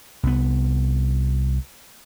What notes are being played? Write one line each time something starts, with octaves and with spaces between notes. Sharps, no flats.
C2 B3